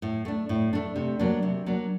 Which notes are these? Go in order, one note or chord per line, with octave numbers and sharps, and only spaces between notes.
A2
A3 D4
A2
A3 D4
C3
F#3 A#3 D4
C3
F#3 A#3 D4